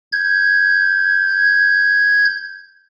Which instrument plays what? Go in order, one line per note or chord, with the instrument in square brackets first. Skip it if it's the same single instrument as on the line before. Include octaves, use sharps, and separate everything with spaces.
[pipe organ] G6 G#6